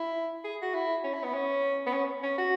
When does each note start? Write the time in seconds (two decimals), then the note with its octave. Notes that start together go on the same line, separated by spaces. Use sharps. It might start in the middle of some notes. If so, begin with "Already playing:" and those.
Already playing: E4
0.44 G#4
0.62 F#4
0.74 E4
1.04 C#4
1.14 E4
1.24 B3
1.34 C#4
1.86 B3
1.93 C#4
2.23 C#4
2.38 F#4